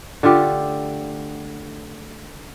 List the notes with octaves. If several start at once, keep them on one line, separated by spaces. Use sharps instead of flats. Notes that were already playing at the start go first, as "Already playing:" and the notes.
D3 A3 F4 G4